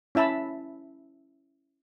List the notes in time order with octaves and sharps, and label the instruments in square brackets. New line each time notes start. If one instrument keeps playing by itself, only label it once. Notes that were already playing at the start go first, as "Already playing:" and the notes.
[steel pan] C#4 E4 E5 A5 B5